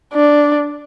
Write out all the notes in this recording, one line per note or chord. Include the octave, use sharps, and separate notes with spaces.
D4